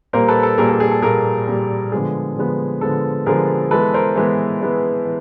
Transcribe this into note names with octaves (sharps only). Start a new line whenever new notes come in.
A#2 G3 A#3 A#4 C5
A4 B4
A4
A#2 G3 A#3 G#4 A#4
A4
G#4
A4
A#2 G3 A#3 G#4 A#4
A#2 G3 A#3
D3 F3 G#3 B3 G#4
D3 F3 G#3 B3
D3 F3 G#3 B3 A4
D3 F3 G#3 B3 G#4 A#4
E3 G#3 B3 A4 B4
A#4 C5
E3 G#3 B3
E3 G#3 B3
E3